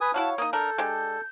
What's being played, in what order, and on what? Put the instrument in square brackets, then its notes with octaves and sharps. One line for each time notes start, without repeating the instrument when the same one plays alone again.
[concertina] B4 G#5 D#6
[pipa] E4 F#4 F5 [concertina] C#5 [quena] A5
[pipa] A#3 D#4 [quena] D#6
[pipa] D4 A#4 [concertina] A4 [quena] G6
[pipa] G#3 D4 G4